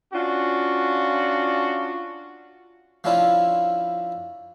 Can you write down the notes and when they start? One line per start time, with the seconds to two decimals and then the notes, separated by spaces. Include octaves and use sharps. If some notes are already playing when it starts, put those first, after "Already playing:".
0.14 C#4 D4 F4 F#4
3.04 F3 C#4 D4 E4 F4